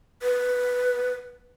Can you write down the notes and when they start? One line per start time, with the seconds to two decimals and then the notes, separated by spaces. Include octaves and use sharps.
0.23 B4